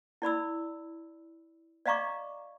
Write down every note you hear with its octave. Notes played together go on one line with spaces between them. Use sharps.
E4 D5 B5 E6
D5 D#5 F5 A#5 C#6 D6